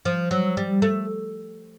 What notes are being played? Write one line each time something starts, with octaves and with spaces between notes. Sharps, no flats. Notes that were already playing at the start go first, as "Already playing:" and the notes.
F3
F#3
G3
A3